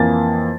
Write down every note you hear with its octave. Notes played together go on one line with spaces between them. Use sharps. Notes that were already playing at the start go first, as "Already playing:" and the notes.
Already playing: F2 E3 A#3 A6